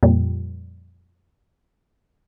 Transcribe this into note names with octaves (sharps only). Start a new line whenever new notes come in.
F2 A#2 G3